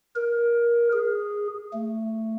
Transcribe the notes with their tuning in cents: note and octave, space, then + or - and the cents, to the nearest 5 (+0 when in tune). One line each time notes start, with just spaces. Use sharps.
A#4 +20
G#4 -10
A3 +15